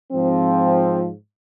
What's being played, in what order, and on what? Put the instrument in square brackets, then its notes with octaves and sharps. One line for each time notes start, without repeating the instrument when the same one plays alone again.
[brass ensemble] G#2 F3 C4